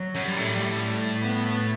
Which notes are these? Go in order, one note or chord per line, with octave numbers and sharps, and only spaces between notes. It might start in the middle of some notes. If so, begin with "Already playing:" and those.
Already playing: F#3
F#2
G3
A2
G3
B3